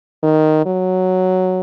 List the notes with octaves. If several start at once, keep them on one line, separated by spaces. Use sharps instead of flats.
D#3
F#3